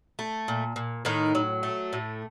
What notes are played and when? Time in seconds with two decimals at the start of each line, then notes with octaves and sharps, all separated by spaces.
0.19 A3
0.48 A#2
0.76 A#2
1.05 A2 D#3 D#4
1.35 F#3
1.63 A3
1.93 A2